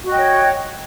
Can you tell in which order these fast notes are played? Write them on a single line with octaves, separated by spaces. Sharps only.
F#4 D#5 G5 C#5